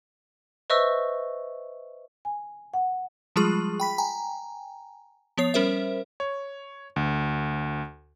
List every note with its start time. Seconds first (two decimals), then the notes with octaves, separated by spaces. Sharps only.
0.70 B4 C5 D#5 E5 C#6 E6
2.25 G#5
2.74 F#5
3.36 F3 G3 G#3 F4 G#4 C#6
3.80 G5 B5 B6
3.98 G5 G#5 A#5
5.38 F3 B3 C#5 C7
5.54 G3 C#4 A#4 C5 E5
6.20 C#5
6.96 D2